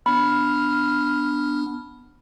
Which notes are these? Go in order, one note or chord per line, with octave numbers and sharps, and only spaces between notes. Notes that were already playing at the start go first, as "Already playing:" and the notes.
B3 D4 B5 F6